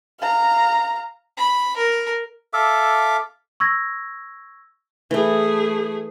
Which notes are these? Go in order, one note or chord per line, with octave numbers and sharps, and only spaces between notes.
F5 A#5
B5
A#4
A4 E5 F5 D6
C#6 E6 G#6 A#6
E3 A3 E4 G#4